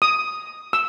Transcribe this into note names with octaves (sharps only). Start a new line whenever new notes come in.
D#6
E6